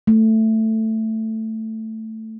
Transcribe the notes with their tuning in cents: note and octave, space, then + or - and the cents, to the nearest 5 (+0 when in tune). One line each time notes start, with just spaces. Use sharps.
A3 +10